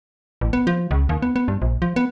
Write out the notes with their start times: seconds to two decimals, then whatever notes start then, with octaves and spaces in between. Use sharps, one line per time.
0.41 A1
0.53 B3
0.67 F3
0.91 C#2
1.09 D#2
1.22 B3
1.36 B3
1.48 G2
1.62 A#1
1.82 F3
1.96 B3